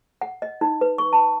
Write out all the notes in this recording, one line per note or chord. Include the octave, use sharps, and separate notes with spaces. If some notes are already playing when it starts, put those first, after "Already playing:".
F#5
D#5
D#4
B4
C#6
A5